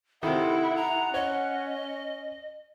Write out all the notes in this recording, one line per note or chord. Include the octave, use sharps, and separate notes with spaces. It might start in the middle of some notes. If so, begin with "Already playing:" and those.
C3 D#3 E4 A4 F#5
A#5
C#4 C#5 D#5